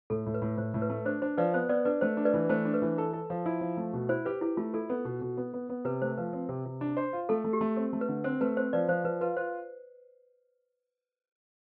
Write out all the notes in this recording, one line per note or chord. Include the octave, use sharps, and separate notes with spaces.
A2 A4
A2
B4
A2
A2 C5
A2
B4
A3
D4 C5
D4 C5
F3 B4 D5
B3 C5
B3 B4 D5
D4 B4 D5
A3 C5
D4
B4 D5
E3
A3 C5
D4
B4
E3
A4
A4
F3
E4
F3
A3
B2
E4 C5
G4 B4
E4 G4
A3 F4
E4 A4
B3
B2
B2
B3
B3
B3
C3 B4
A3 C5
F3 B4
C4
C3
C3
D4
C5
F4
A3 A4
A3
G4
A3
C4
A3
B4
D3
C4 C5
A3 B4
C4 C5
F3 B4 D5
F3 C5
F3 B4
F4 B4
F4 C5